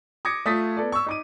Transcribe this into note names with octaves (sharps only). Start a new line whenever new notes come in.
D6 D#6 G#6 A#6 C#7
A3 F4 D#6 A6 B6
B3 A4 D5
C#6 E6
D#4 D6 D#7